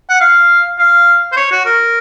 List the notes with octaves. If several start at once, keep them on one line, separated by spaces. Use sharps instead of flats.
F#5
F5
F5
C5
C#5
F#4
A#4